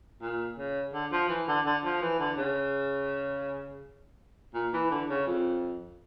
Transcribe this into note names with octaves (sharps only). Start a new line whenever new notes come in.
A#2
C#3
D3
F3
E3
D3
D3
F3
E3
D3
C#3
A#2
E3
D3
C#3
F2